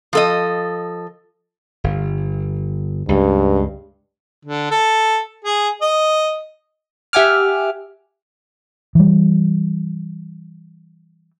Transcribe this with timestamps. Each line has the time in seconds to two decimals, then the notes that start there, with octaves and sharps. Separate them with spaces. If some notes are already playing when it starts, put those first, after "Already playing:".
0.13 F3 A4 D#5
1.84 G1
3.09 C#2 G2
4.45 D3
4.71 A4
5.45 G#4
5.82 D#5
7.13 G4 E5 F#5 G#5 D6 F6
8.95 E3 G3